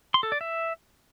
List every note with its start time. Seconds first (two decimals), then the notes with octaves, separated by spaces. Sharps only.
0.14 C6
0.23 A4
0.32 D5
0.41 E5